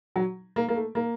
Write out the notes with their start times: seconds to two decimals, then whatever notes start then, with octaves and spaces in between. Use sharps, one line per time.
0.16 F#3
0.56 A#3
0.69 A#3
0.76 A3
0.95 A#3